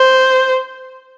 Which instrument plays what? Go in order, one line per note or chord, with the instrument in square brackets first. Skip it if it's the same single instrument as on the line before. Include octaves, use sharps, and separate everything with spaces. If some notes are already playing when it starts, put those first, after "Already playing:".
Already playing: [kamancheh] C5